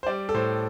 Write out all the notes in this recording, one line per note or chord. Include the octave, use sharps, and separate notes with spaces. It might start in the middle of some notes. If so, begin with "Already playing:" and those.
C5
G3 D5
A4
A2 C5